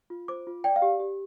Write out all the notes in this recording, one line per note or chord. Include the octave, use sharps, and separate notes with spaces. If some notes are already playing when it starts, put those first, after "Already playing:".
F4
C5 D6
F4
D5 G5
F5
G4
G4